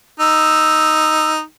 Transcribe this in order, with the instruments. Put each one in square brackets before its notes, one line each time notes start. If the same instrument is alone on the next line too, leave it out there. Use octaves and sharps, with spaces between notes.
[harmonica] D#4 [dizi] E6